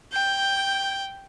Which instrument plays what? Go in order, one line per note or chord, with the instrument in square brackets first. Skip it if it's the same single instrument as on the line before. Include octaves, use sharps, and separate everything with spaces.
[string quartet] G5 [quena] G6